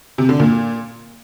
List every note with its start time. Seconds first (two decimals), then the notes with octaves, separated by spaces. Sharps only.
0.18 C3
0.29 D3
0.40 A#2